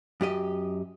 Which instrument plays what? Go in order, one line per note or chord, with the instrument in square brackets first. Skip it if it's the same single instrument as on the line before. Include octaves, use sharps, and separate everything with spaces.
[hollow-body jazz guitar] F#2 G4 D#5